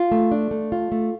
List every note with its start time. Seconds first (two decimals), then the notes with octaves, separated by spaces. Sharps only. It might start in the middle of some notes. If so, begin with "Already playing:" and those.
Already playing: F4
0.12 A3
0.31 D4
0.51 A3
0.72 F4
0.92 A3